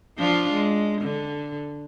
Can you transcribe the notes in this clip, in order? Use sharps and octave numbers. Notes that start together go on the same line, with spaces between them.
F3 D4 F4
G#3
D3